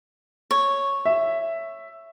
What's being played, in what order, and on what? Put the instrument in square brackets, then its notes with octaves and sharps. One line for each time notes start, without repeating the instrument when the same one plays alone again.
[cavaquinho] C#5
[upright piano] E5